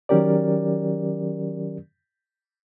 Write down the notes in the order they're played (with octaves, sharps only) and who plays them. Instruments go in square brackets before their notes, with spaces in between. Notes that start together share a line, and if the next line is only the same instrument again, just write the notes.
[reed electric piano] D#3 F#3 C#4 G4 A#4 D5